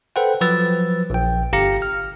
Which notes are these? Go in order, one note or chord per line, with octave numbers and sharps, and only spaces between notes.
A4 B4 C5 F#5 G5
F3 F#3 B4 E6 A6
A#1 G5
G1 G4 F5 A#5 A#6 C#7
F6